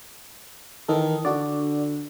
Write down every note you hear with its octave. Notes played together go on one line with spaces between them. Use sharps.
D#3 E3 A4
D3 D4 F#4 D5